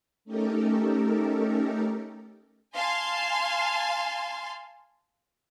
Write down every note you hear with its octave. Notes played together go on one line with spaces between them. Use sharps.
A3 C#4 D#4 G4 A4 A#4
F5 G#5 A5 C6